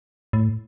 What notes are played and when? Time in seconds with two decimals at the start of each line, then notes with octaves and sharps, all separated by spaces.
0.33 A2